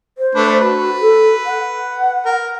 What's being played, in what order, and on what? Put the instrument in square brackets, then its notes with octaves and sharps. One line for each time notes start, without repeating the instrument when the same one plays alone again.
[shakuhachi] C5
[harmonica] A3 D4 B4
[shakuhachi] F#4 [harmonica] B4
[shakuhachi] A4
F#5
[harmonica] A#4